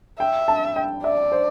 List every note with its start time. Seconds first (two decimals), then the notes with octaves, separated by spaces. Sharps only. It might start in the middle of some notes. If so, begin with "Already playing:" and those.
0.19 E5 G5
0.48 A5
0.76 G5
1.04 D5 E5
1.32 C5